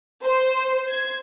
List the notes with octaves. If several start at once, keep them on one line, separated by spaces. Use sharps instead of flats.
C5
G#6